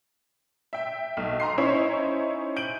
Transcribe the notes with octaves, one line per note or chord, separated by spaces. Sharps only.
E5 G5
B1
A#5 C6 C7
C#4 D#4 E4 C5 C#5
G6 D7 D#7 F#7